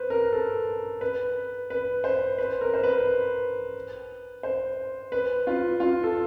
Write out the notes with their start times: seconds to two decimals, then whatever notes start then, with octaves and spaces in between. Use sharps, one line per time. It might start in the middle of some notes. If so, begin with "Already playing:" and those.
Already playing: B4 C5
0.10 A#4
0.33 A4
1.01 B4
1.70 B4
2.04 C5
2.38 B4
2.61 A#4
2.74 C5
2.83 B4
4.43 C5
5.12 B4
5.47 F4
5.80 F4
6.04 A4